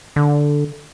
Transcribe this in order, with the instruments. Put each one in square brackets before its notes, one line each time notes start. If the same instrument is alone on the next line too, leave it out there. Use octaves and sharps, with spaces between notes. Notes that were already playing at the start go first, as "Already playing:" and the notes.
[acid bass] D3